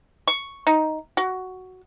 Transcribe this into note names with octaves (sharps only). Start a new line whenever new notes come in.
C#6
D#4
F#4